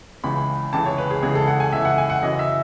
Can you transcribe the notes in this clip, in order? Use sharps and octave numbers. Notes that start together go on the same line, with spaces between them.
C#2 C#3 E3 B5
C#2 C#3 E3 A5
C#5
B4
G#4
C#2 C#3 E3 G#4
A4
F#5
G#5
C#2 C#3 E3 E5
F#5
G#5
F#5
F#2 C#3 E3 D#5
E5